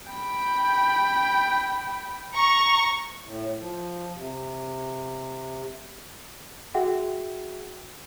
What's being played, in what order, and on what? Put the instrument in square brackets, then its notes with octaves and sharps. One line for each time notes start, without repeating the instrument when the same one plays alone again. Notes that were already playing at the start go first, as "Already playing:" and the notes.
[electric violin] G5 B5
[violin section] A#5 C#6
[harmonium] A2
F3
C3
[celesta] F#4 G#4 E5 F#5 G5